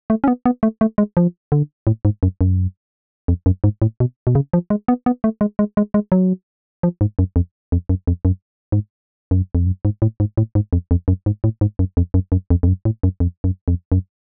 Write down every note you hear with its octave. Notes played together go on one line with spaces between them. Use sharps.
A3
C#4
B3
B3
A3
A3
G#3
F3
D3
A2
G#2
F#2
F#2
F2
F#2
G#2
A2
B2
B2
C#3
F3
G#3
B3
B3
A3
G#3
G#3
G#3
G#3
F#3
F3
G#2
F#2
F2
F2
F#2
F2
F#2
G#2
F#2
F2
F#2
G#2
A2
G#2
A2
G#2
F2
F2
F#2
G#2
A2
G#2
F#2
F2
F#2
F#2
F2
F2
F#2
A2
F#2
F2
F#2
F2
F#2